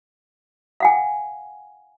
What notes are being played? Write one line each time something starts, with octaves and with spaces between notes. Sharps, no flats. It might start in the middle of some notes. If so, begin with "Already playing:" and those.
F5 F#5 G#5